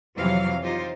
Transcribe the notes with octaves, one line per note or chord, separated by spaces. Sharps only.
F2 C3 E3 F#3 F5
D#4 F4 G4 C5